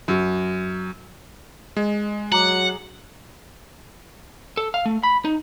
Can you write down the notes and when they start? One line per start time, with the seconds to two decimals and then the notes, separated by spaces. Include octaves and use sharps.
0.08 F#2
1.77 G#3 D#5
2.32 F#3 F#5 A#5 D6
4.57 A4
4.74 F5
4.86 A3
5.03 B5
5.25 D#4